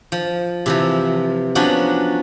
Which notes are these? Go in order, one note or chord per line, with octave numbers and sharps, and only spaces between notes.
F3
C3 E3 F3
F3 F#3 B3 C#4 D4